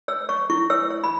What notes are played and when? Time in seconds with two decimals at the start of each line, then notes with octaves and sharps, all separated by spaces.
0.08 C#5 E6
0.29 C#5 C#6
0.50 E4 C#6
0.70 C#5 E6
0.90 C#5
1.04 B5